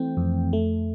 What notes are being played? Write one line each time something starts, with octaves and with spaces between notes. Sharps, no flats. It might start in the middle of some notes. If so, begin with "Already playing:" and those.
Already playing: E3 A3 C4 G5
F2
A3